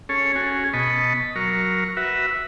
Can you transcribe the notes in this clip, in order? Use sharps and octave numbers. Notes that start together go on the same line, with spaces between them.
C#4 G#4 A4 C#5
C#4 F#4 G#4 G#5
B2 D#5 A5 B5 C#6
F#3 A#4 C#6 F6
F#4 B4 E5 F#5